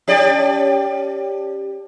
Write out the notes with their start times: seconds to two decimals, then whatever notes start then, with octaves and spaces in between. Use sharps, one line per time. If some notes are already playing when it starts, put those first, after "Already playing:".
0.08 C#4 G4 D5